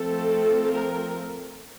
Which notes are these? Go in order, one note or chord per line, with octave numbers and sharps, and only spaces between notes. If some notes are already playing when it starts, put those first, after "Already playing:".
Already playing: F3 A3 C4 A4
A#4